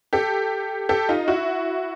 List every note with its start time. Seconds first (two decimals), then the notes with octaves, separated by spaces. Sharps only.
0.13 G4 A4
0.89 G4 A4
1.09 D#4 F4
1.28 E4 F#4